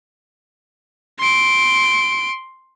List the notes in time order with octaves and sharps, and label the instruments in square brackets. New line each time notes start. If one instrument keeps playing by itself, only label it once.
[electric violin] C6 D7